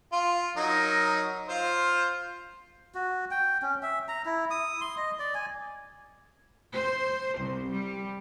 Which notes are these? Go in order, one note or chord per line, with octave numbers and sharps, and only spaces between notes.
F4
F#3 D#4 A#4
F4 C5 F5
F#4
G5
C#4
E5
A#5
E4
D#6
C6
D#5
D5
G#5
C5
C2
G3